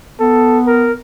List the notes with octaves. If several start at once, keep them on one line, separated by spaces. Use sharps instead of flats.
B3 A4
A#4